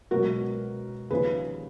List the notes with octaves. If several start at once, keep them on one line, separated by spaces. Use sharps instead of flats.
C#2 B2 F#3 F#4 A#4
D#2 C#3 F3 G#4 B4